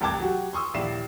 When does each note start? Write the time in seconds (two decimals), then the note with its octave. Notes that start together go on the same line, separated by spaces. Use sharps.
0.01 F1 C2 G5 A5 D6 G#6
0.20 F#3 F#4 G4
0.53 C6 C#6 D#6 E6
0.74 D#1 A#1 E4 D5 C7 E7